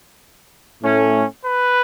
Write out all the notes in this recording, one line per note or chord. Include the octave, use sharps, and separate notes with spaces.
A2 A3 C#4
B4